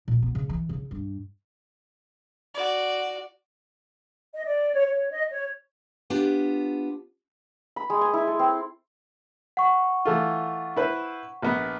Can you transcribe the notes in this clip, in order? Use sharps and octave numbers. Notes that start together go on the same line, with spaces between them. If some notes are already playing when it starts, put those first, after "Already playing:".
A#2
B3
C#3
E3
C#3
G2
F#4 D5
D#5
D5
C#5
C#5
D#5
C#5
B3 D4 F4 G4
B5
G#3
G#5
E4
A4
C4
F#5 C#6
E3 A3 F4
E4 B4 C5
A#1 B3